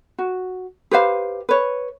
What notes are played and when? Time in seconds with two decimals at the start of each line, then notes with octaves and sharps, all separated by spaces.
0.19 F#4
0.91 G4 B4 C5 F5
1.49 B4 C#5